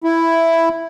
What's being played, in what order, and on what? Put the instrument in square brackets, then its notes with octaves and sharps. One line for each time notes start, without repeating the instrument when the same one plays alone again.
[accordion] E4